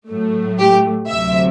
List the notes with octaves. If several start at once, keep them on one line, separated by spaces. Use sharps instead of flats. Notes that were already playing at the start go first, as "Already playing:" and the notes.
A2 F#3 A3
G4
D2 C3 F#3 E5